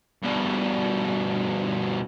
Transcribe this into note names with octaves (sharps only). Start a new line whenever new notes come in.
G2 B2